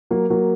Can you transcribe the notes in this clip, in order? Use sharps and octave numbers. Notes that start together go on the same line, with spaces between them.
F#3 A#3
F#3 A#3